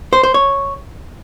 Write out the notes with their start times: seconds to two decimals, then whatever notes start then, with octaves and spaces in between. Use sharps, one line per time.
0.13 C5
0.23 C5
0.34 C#5